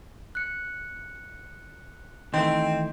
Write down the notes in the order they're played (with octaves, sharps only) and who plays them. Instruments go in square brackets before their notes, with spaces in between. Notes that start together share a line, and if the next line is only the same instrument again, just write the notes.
[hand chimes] F#6 C#7
[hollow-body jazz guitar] D#3 E3 A3 [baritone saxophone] C4 [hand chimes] D#5